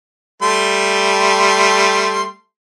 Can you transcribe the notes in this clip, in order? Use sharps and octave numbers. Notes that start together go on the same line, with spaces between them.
G3 A3 C6